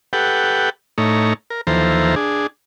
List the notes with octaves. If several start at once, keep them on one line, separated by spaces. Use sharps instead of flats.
G4 A4 B4 F#5 G5
A2 A3 D#4 C#5 A#5
A#4
D#2 E3 F3 A4 C5 A#5
D4 G#4